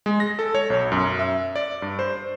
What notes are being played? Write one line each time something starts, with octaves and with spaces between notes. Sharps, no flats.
G#3
A#6
A4
C#5
B1
F#2
E5
D5
G2
C5